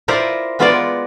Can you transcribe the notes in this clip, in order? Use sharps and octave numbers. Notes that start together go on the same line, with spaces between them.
E4 F4 A#4 C5 D5
G#3 B3 F4 F#4 A#4 D5